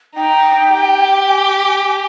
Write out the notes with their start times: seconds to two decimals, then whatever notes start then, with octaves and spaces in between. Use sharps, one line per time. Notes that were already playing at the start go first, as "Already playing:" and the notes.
0.16 D#4 G5
0.71 G4
1.26 G#5